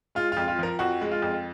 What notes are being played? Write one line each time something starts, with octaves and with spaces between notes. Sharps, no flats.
G#3 F4
F2 F4
F4
F3 A#4
F2 F#4
G#3
F4
F2